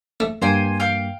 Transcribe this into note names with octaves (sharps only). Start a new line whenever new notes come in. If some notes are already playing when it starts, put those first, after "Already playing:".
A3
G2 A#3 C5 G5 G#5
F5 G5 F6